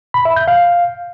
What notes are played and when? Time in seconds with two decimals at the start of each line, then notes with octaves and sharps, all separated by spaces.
0.14 B5
0.25 E5
0.36 G6
0.48 F5